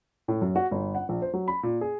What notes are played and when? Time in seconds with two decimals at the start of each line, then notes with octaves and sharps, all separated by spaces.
0.28 A2
0.42 F#2
0.56 F#4
0.71 G1
0.95 F#5
1.09 A#1
1.22 C5
1.34 F#3
1.48 B5
1.63 A#2
1.81 G#4